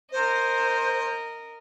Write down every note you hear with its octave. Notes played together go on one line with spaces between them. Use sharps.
A#4 C5 D#5